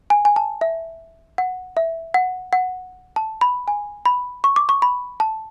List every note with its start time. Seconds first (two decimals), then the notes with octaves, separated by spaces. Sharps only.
0.10 G#5
0.25 G#5
0.36 A5
0.61 E5
1.38 F#5
1.77 E5
2.14 F#5
2.53 F#5
3.16 A5
3.41 B5
3.68 G#5
4.06 B5
4.44 C#6
4.56 D6
4.69 C#6
4.82 B5
5.20 A5